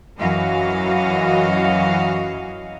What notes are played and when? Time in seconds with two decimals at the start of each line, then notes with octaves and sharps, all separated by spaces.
0.18 F#2 E3 F#3 F#4 D#5 F5